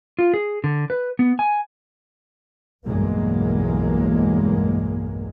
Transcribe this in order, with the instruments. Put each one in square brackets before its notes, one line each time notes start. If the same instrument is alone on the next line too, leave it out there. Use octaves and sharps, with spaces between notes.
[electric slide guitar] F4
G#4
D3
B4
B3
G#5
[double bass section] B1 E2 G2 F#3 G#3 A#3